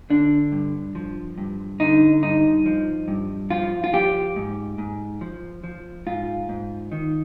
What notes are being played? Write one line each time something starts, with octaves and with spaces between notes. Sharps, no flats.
D3 D4
G2
F3
G2
D3 D#4
G2 D#4
F3
G2
F3 F4
F4
F3 G4
G#2
G#2
F3
F3
G#2 F4
G#2
D#3